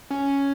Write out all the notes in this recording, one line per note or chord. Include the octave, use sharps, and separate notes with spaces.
C#4